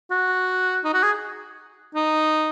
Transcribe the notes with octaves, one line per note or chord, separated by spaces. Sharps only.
F#4
D#4
F#4
G#4
D#4